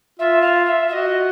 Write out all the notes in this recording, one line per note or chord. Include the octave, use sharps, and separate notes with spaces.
F4 E5
F5
F5
E5
F#4 D#5 E5